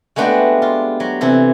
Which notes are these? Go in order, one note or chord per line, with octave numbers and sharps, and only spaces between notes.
G#3 A3 B3 D4 F#4 G4
F4
F#3
C3 E3 A4